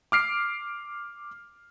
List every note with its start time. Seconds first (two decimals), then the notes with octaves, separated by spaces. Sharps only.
0.12 D6 F6 C7 D7